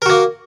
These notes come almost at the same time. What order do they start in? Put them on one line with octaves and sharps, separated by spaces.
A#4 F#4 A#3